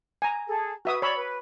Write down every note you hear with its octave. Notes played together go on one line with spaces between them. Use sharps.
G#5 A#5
G#4 A4
F#4 B4 E5 D#6
C#5 D5 B5 E6
B4